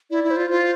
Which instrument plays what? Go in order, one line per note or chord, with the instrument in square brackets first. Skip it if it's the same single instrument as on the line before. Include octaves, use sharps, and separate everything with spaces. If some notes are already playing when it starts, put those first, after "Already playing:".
[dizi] E4 [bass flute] D5
[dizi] E4
[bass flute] C5
[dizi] F4
[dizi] F4 [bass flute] C5